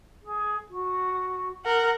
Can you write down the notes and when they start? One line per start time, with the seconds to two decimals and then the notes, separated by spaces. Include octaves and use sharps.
0.22 G#4
0.69 F#4
1.65 A#4 F#5